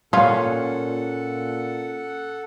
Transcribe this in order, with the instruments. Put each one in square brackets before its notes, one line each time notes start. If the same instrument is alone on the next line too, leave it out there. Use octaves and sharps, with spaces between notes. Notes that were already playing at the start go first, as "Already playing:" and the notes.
[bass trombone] A#2 [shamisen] G3 F4 [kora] C#4 F5 [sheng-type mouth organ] A4 F#5